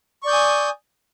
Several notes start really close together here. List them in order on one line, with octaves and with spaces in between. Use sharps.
C#6 D5 G6 D#6 G#5